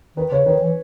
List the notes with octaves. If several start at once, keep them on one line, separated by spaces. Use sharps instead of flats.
D#3 B4
C#3 C#5
D#3 B4
E3